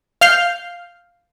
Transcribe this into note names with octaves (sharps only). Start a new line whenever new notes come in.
F5 F6 G6 C7